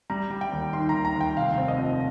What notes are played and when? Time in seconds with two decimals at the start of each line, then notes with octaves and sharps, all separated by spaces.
0.10 G3 A#5
0.31 G3
0.41 G5
0.52 D#2
0.73 D#3 C6
0.89 A#5
0.94 D#2
1.05 A#5
1.16 D#2 G5
1.37 F1 F5
1.58 C4
1.68 D#5
1.79 F3